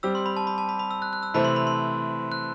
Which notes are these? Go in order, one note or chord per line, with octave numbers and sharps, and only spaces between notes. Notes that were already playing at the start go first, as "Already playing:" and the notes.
G3 C4 G4 E6
C6
B5
A5
B5
A5
B5
B5
E6
F#6
F#6
E6
C3 E3 A3 C4 B5
C6
B5
C6
F#6